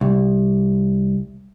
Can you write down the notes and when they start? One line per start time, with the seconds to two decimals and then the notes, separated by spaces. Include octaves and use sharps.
0.01 C2